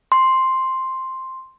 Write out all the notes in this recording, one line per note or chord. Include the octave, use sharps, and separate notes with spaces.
C6